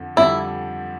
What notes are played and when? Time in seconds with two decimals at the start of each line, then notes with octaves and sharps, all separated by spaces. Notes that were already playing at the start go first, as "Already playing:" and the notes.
Already playing: F2 D3
0.16 F2 D3 G3 E4